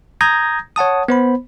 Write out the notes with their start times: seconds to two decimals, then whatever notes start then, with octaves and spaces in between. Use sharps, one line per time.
0.21 A#5 D#6 G6 G#6 A#6
0.76 C#5 F#5 A5 D#6
1.08 B3 C5 B5